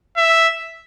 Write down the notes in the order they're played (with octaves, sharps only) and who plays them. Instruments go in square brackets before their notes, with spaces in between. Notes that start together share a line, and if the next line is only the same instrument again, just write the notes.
[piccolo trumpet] E5